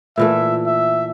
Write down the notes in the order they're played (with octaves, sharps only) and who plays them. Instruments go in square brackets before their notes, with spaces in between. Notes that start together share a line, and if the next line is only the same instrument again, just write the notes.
[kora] A#2 E3 A3 [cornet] E5
[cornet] E5